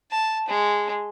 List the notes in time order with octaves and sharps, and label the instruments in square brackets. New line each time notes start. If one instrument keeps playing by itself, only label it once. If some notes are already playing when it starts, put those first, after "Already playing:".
[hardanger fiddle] A5
G#3